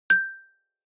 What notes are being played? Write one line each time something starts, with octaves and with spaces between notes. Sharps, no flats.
G6